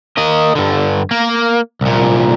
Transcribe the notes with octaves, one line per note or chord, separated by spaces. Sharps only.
A#3 D#5
G2 D3
A#3
C2 A#2